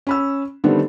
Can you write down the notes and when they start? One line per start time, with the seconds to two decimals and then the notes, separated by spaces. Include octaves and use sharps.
0.07 C#4 B5 E6
0.64 D3 D#3 G3 A3 B3 C4